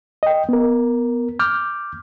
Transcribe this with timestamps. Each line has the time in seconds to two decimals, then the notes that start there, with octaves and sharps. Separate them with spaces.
0.23 D#5 G5
0.49 B3 A#4
1.40 D6 F6 G6